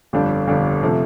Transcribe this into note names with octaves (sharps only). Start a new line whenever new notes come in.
G1 F2 D3 G3 D4
G1 F2 D3 G3 D4
C3 F3 A3